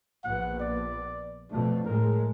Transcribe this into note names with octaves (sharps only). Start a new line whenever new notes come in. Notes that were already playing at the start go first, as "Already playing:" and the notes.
A#1 B3 F#5
D5
F2 B2 A3 D4
A2 G#3 A#4